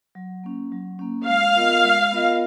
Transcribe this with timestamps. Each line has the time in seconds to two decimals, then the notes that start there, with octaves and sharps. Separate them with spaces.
0.15 F#3
0.44 A#3 C#4
0.72 F#3
0.99 A#3 C#4
1.27 G#3 F5
1.56 B3 F4 A#4 D#5
1.84 G#3
2.12 B3 F4 A#4 D#5